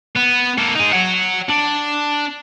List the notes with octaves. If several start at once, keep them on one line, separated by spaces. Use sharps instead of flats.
B3
A#3 A4
D#4 G#4
C#5 F#5
D4